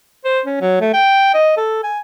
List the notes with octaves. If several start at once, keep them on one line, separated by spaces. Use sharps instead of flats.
C5
C#4
F#3
A3
G5
D#5
A4
G#5